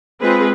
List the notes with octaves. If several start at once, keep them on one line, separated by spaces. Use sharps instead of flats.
G#3 C4 F4 G#4 B4